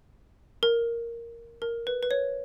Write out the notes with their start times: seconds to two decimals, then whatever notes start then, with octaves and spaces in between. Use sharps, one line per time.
0.63 A#4
1.62 A#4
1.87 B4
2.03 B4
2.11 C#5